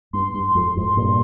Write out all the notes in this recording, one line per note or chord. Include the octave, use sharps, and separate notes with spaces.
G2 C6
G2 C6
F2 G#2
F2 G#2
G2 A#2